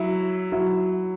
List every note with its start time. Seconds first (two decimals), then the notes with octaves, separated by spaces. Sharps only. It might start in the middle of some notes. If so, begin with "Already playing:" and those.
Already playing: F#3 E4
0.52 F#3 E4